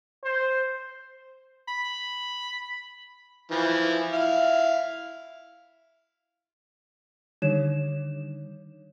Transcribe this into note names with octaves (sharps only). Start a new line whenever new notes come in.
C5
B5
E3 F3
E4 F5
D3 D#3 G3 D#4 C#5 E7